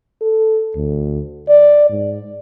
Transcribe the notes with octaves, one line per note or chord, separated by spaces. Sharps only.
A4
D2
D5
G#2